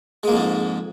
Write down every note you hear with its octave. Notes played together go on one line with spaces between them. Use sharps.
F2 G#2 G#3 A#3